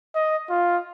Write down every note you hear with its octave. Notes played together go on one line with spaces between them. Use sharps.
D#5
F4